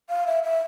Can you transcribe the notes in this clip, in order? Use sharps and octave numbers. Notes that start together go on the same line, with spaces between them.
F5
E5
E5